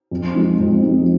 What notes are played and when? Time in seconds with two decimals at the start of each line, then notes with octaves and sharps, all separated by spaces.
0.11 F2
0.35 F3 G#3 D#4
0.60 F2
0.83 F3 G#3 D#4